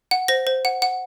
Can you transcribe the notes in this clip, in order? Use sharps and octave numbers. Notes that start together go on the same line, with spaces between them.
F#5
C5 A#6
C5
F#5
F#5